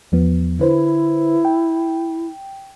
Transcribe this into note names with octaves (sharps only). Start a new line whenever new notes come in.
E2 F3 B3
D3 E4 B4 C5
G5